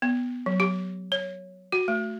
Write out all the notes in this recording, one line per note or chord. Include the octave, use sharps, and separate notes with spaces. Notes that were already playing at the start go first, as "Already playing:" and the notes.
B3
F#3
G4
C#5
F#4
A3